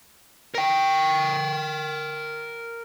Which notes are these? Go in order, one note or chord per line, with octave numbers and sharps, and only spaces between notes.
A#4 G5